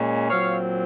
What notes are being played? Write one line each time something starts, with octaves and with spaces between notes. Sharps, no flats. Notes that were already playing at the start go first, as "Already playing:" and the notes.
Already playing: A#2 G#3 C#4
A#2 F#3 C4 C#5 F5